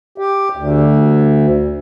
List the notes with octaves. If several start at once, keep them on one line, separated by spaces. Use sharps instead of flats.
G4
D2